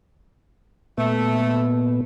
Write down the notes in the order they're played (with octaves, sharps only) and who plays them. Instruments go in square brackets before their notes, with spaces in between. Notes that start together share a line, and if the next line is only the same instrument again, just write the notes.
[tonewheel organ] A#2 B3 [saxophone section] A3